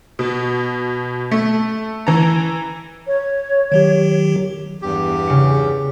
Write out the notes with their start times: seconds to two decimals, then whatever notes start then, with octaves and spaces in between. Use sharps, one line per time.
0.19 B2
1.31 A3
2.07 E3 A#5
3.07 C#5
3.72 D#3 F#3 G4
4.82 E2 G2 G4
5.27 C#3 C#7